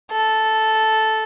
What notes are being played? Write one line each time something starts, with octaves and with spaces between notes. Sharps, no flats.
A4